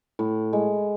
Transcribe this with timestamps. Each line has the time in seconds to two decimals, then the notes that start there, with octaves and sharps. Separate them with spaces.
0.19 A2
0.53 G#3